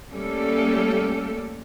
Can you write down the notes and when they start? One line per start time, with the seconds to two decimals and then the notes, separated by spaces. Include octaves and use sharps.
0.11 G3 A3 A#3 C#4 G4 A4